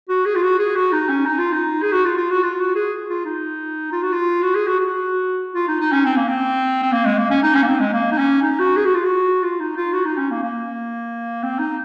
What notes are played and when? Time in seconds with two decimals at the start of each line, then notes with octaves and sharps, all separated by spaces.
0.09 F#4
0.25 G#4
0.35 F4
0.43 F#4
0.59 G#4
0.76 F#4
0.92 D#4
1.09 C#4
1.25 D#4
1.38 F4
1.52 D#4
1.82 G#4
1.92 F#4
2.05 F4
2.17 F4
2.30 F#4
2.43 F4
2.59 F#4
2.75 G#4
3.09 F4
3.25 D#4
3.92 F4
4.02 F#4
4.12 F4
4.42 F#4
4.55 G#4
4.67 F#4
4.80 F#4
5.54 F4
5.68 D#4
5.80 D#4
5.92 C#4
6.05 C4
6.16 A#3
6.28 C4
6.83 C4
6.92 A#3
7.05 G#3
7.18 A#3
7.30 C#4
7.43 D#4
7.55 C#4
7.63 A#3
7.68 C4
7.80 G#3
7.93 A#3
8.11 D#4
8.18 C#4
8.42 D#4
8.59 F#4
8.76 G#4
8.85 F#4
8.94 F4
9.04 F#4
9.43 F4
9.60 D#4
9.76 F4
9.92 F#4
10.05 D#4
10.17 C#4
10.31 A#3
10.43 A#3
11.43 C4
11.59 D#4